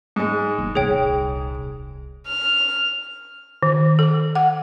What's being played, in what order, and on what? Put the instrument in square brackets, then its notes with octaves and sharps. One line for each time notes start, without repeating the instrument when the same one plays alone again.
[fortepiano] G#2 G#3
[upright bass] G1
[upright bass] D#1 C2 [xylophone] G#4 C#5 G5
[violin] F6
[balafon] D#3
A4
F#5